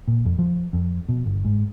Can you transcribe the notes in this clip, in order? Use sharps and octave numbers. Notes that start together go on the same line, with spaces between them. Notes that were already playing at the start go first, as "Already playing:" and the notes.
A#2
F2
F3
F2
B2
G1
G#2